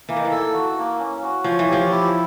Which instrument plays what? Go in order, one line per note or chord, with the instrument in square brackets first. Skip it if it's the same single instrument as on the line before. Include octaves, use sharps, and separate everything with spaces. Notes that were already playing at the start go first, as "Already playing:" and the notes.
[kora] E3 [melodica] A#3
[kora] D#3
E3
[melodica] A4
F#4
A#3
C#4
F#4
[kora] F3 [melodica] C#5
[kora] E3
[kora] F3 [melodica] G4
[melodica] E4